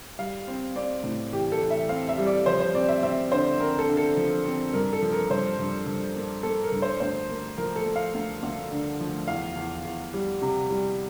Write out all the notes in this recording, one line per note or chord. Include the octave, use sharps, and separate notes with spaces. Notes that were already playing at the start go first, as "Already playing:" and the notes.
G3 F5
C4
C4 D5
A2
E3 G4
A4
E3
E5
C4 F5
E5
G3
D5
F3 C5
C5
C4 D5
E5
C4 E5
D3 C5
C4 A#4
A4
D3
A4
F3
C4
G2 A#4
A4
F3
A#4
G2 C5
G2
G2
A#3
A#3 A4
A#4
G2
C5
D2 C5
A#3
F3 A#4
A4
A#3
F5
D2
D2
D3
F3
E2 F5
E2
E2
G3
C3
G3